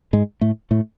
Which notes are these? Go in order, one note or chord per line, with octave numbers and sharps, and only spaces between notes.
G#2 G#3
A2 A3
A2 A3